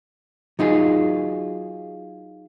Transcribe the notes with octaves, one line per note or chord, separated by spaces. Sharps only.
F#3 D#4 F4 G#4